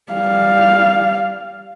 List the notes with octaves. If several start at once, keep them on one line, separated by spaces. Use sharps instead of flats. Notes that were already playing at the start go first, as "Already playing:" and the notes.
G3 F5